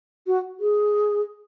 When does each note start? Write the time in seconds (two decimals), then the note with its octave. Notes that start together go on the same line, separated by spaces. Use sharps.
0.27 F#4
0.60 G#4